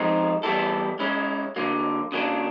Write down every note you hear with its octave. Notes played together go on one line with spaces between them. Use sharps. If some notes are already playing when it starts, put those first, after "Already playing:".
Already playing: F3 G#3 C4 D#4
E3 G3 B3 E4 A4
G#3 C#4 E4
D3 F#3 A#3
C#3 F#3 A#3 D4